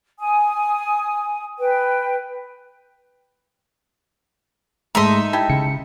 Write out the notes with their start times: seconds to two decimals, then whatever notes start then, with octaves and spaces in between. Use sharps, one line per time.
0.19 G#5 D#6
1.59 B4 G5
4.95 G#2 G#3 A3 D#4 A4 E5 A#5 C6
5.33 E4 G4 A5
5.50 C#3 C#7